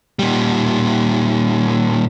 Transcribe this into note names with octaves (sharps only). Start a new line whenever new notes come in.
A#2 G3